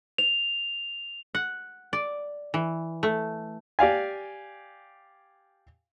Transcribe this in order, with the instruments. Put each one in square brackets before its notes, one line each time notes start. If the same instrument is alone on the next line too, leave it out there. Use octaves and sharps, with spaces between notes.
[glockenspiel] F7
[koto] F#5
D5
E3
A3
[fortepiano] G4 D5 F5 G#5